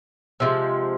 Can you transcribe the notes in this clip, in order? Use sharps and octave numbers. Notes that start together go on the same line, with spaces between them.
C3 F3 G#3